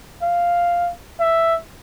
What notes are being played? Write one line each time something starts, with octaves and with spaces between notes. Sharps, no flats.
F5
E5